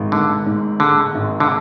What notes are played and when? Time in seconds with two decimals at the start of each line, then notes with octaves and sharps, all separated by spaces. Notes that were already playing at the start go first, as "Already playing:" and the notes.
Already playing: G#1 G#3
0.12 G#2 D3
0.46 G#2
0.80 D3 G#3
1.14 G#1
1.40 D3